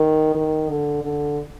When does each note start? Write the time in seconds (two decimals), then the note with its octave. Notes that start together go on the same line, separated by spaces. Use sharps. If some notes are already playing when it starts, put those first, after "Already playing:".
Already playing: D#3
0.35 D#3
0.70 D3
1.04 D3